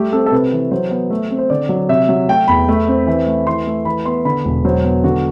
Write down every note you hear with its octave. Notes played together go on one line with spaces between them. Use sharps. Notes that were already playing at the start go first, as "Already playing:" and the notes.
Already playing: G3 A3 G4
C4 A4
A4
C3 B4
E3
F#3 C5
B3
A3
C4
C5
D3 D5
F#3
C3 E5
F#3
A3 G5
E2 B5
A3
C4
E3
A3
E3 C6
A3
E3 B5
B3 C6
D3 B5
E1
F#3 C5
B3
D3 F#4